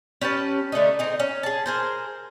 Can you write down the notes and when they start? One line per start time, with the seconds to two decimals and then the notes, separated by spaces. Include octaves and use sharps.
0.21 C#4 G4 B4 A5
0.72 D3 A3 D4 D#4
0.99 C4 D#4 G#4
1.20 C#4
1.43 G#4 A5
1.66 G#4 A#4 C5